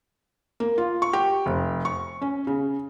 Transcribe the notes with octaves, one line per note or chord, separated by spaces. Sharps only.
A#3
F4
C#6
G4
F1
C#6
C#4
C#3